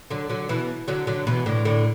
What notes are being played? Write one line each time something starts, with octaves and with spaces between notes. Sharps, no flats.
D3 F#3
D3 F#3
B2 E3
D3 F#3
D3 F#3
B2 E3
A2 D3
A2 D3